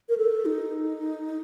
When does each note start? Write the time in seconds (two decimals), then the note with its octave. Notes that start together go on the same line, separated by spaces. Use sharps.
0.09 A#4
0.18 A4
0.46 D#4